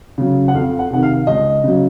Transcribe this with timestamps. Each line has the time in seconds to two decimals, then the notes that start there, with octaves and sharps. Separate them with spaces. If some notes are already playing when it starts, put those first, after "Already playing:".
0.18 C#3 F#3
0.48 F#5
0.54 F2 F5
0.79 F#5
0.91 C3 D#3 F#5
1.03 F5
1.27 C#2 D#5
1.64 C#3 F#3